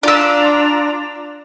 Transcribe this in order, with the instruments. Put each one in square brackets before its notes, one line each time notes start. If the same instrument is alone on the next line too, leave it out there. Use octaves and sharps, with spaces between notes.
[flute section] D4 F4 A#5 [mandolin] D5 E6